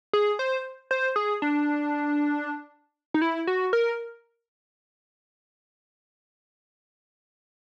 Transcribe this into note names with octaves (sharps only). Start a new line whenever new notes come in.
G#4
C5
C5
G#4
D4
D#4
E4
F#4
A#4